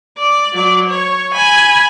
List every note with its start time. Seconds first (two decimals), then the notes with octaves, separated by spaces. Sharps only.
0.18 D5
0.53 F#3 D5
0.89 C#5
1.33 G#5 B5